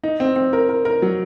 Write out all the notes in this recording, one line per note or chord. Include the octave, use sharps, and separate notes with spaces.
D#4
C4
C4
A#4
A#4
A#4
F#3